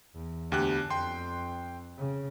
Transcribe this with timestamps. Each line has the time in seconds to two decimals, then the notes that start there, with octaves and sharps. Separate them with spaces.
0.14 E2
0.52 D2 B3 D4 G4 F#6
0.90 F2 G5 C6
1.98 C#3